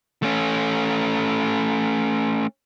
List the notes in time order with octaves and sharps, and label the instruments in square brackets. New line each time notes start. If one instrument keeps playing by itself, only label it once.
[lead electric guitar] A3 C#4